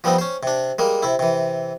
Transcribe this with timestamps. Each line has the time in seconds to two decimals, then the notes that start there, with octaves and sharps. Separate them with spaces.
0.04 F3 G3 B3 C4 D#4
0.18 C#4 C5
0.43 C3 D4
0.78 G3 G#3 A#3
1.03 C3 E4
1.19 C3 E3